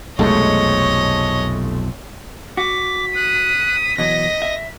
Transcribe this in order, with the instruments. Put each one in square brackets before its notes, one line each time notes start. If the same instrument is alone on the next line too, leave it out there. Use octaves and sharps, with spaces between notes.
[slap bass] B1 F2 C3 [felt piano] G#3 A3 [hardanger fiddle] C#5 D#5
[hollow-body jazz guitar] F#4 [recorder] D6 [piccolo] B6
[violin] D#6 [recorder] F#6
[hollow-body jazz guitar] B2 E3 F#3 [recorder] D#5 [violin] A#6
[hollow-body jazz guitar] E5